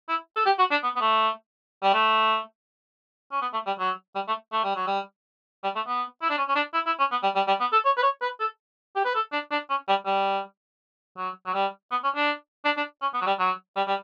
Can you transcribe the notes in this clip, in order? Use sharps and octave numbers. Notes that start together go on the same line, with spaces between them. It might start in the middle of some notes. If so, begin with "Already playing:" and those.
E4
A4
G4
F#4
D4
B3
B3
A3
G3
A3
C#4
B3
A3
G3
F#3
G3
A3
A3
G3
F#3
G3
G3
A3
B3
E4
D4
C#4
C#4
D4
E4
E4
C#4
B3
G3
G3
G3
B3
A4
C#5
B4
C#5
B4
A4
G4
B4
A4
D4
D4
C#4
G3
G3
F#3
F#3
G3
B3
C#4
D4
D4
D4
C#4
B3
F#3
G3
F#3
G3
G3